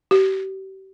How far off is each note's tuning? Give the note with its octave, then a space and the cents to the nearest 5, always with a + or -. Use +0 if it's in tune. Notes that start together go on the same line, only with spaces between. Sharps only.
G4 -35